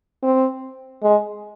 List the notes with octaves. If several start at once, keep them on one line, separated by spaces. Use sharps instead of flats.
C4
G#3